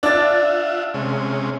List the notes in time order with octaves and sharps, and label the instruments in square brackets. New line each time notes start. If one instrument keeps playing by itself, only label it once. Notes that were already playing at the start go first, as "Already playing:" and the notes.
[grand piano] D4 A6 [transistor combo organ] F4 E5 F#5
[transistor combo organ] C3 G#3 C#4